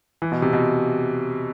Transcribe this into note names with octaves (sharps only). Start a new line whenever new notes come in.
E3
B2
C3
B2